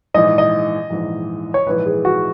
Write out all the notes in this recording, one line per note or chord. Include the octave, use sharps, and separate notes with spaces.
A#1 G#2 E3 D#5
D#5
A#1 G#2 E3
C#5
A#1 G#2 E3 B4
G#4
F#4